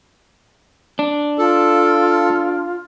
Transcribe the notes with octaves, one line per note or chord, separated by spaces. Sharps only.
D4
F4 A4